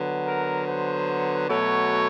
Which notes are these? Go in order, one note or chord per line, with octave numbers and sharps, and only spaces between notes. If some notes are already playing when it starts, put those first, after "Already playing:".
Already playing: D3 F#3 B3
A#4
C5
B2 F#3 A3 C#5